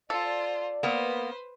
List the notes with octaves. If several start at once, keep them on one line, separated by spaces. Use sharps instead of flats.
F4 A4 C5 D5
A#3 B3 B4 C5